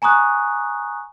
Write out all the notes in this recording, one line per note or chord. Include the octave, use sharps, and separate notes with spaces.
G#5 A#5 C#6 D#6 F#6